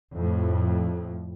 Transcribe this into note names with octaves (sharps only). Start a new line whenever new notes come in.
F2 A2